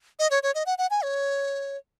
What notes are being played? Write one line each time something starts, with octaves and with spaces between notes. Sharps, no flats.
D#5
C#5
C#5
D#5
F#5
F#5
G#5
C#5